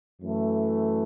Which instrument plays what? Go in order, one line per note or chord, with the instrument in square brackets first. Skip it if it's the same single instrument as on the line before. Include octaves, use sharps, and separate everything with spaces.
[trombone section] F#2 E3 A3